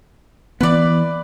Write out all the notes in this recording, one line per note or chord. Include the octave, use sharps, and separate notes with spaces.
E3 B3 B4 D5